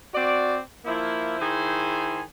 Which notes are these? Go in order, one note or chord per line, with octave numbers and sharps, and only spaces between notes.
C4 F#4 D5
F3 A#3 E4
D#3 E4 G#4 C5 G#5